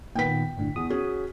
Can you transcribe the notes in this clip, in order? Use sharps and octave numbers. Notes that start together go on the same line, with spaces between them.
A#2 D#3 B3 G5 B6
G1 A2 D3
E2 D#6
C#4 F#4 G#4